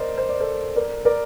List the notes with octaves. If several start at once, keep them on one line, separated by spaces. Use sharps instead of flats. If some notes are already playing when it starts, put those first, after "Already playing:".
Already playing: A#4 C5 D5 D#5
C5
D5
A4 C5
A#4 D5
A#4 D5